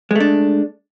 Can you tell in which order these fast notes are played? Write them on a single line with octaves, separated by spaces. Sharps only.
G#3 A3 D4